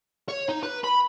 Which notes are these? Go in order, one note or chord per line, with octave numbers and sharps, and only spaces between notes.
C#5
D#4
B4
B5